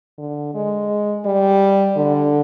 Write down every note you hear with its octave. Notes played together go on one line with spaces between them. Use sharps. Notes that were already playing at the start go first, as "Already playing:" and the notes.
D3
G#3
G3
D3